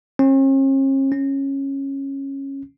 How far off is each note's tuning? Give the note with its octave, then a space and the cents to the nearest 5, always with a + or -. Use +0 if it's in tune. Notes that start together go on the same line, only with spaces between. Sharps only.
C#4 -45
C#4 -15